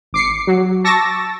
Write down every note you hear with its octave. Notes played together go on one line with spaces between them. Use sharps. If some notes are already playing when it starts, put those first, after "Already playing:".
G#1 D6 C7 C#7
F#3
A5 C#6 D6 E6 A6 A#6